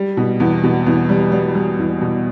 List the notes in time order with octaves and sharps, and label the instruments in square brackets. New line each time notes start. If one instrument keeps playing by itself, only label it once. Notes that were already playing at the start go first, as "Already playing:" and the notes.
Already playing: [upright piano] G3
B2
E2
B2
E2
G3
G3
G3
E2
B2